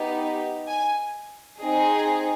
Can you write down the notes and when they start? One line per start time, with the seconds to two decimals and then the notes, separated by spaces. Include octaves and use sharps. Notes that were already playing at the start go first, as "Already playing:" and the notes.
Already playing: B3 D#4 G4
0.68 G#5
1.59 C4 D#4 G#4